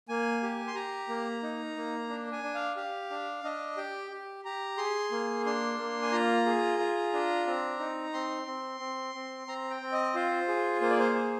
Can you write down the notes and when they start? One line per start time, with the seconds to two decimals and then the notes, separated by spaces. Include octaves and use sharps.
0.09 A#3 G#5
0.43 G4
0.67 C6
0.75 G4 A#5
1.09 A#3
1.43 D#4
1.76 A#3
2.09 D4
2.32 G#5
2.43 D4
2.55 F5
2.76 G4 F5
3.10 D4
3.44 D4 D#5
3.77 G4 G5
4.11 G4
4.45 G4 A#5
4.78 G#4 C6
5.12 A#3
5.46 D4 C6
5.79 A#3
6.02 G#5
6.12 F4 A#5
6.46 G#4
6.79 F4
7.13 D4
7.47 C4
7.79 D#4
8.13 C4 C6
8.47 C4
8.80 C4
9.15 C4
9.47 C4 A#5
9.70 G5
9.81 C4
9.92 D#5
10.15 F4 C5
10.48 G#4
10.81 A#3 C5
10.90 D5
11.00 C5
11.15 G#4